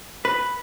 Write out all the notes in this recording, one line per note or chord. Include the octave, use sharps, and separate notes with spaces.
B4